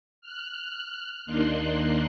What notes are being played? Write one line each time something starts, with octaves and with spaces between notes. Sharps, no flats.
F6 F#6
D#2 A#3 D4 D#4 C6 F#6